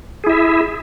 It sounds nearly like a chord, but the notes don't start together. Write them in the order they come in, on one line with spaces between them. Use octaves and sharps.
G#4 E4 E5